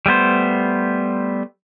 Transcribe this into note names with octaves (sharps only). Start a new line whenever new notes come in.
G3 A3 B3 C5